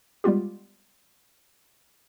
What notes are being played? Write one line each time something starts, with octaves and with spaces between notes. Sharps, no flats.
G3 G#3 B3 F4 G4